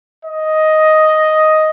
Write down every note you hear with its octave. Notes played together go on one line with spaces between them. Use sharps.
D#5